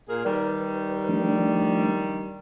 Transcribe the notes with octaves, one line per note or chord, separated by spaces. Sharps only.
A#2 G#4 A#4
D#3 G3 B4
F3 A3 D4